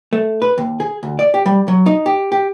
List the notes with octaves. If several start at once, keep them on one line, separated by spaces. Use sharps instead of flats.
A3
B4
D#2
G#4
D2
D5
G4
G3
F#3
D#4
G4
G4